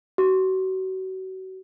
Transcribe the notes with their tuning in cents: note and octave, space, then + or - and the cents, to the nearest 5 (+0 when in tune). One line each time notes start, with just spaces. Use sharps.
F#4 +35